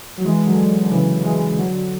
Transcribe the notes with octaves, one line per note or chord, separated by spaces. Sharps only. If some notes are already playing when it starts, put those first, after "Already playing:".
F#3
E3 G#3
D3 F#3
D3
C#3 E3
E3 G#3
D3 F#3